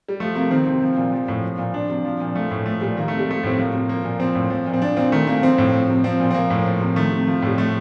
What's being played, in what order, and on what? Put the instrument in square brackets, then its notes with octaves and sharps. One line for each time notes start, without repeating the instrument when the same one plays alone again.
[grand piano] G3
F3 A3
C3 A#3
D#3 C4
C3
F3
A#2
F3
A2
F3
A#2
F3 D4
C3
F3
A#2
F3 A3
A2
F3 A3
A#2 G3
D#3 A#3
C3 A3
G3
F3 A3
A2 C4
F3 A#3
C3
F3 A#3
A#2
F3 C4
A2
F3
A#2
C4
F3 D4
A#2 C4
D#3 A3
C3 A#3
F3 C4
A2
F3
C3
F3 C4
A#2
C4
F3 A#3
A2
F3
C3
D#3 A3
C3
F3
A2 G3
F3 A3